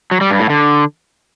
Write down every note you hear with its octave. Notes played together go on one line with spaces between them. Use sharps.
F#3
G3
G2
A2
D3